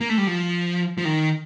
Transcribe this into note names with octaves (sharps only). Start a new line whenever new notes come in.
A#3
A3
G3
F3
F3
D#3